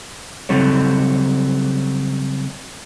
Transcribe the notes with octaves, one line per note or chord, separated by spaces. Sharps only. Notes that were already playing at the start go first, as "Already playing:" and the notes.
C#3 F#3 G3 C4 A4 C#5